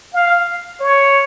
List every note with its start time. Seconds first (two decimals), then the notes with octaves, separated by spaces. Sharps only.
0.14 F5
0.81 C#5